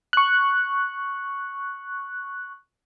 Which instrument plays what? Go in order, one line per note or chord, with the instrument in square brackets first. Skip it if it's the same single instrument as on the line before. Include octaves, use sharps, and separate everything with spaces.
[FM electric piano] C#6 F#6